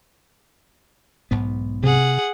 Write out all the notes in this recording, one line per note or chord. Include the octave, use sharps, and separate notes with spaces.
B1 G#2 B3
C3 G#4 F#5